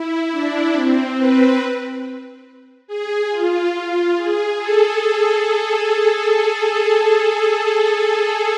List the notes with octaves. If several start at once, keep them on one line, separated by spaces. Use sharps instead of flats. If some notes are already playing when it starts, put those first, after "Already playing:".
Already playing: E4
D4
C4
B4
G#4
F4
G#4
A4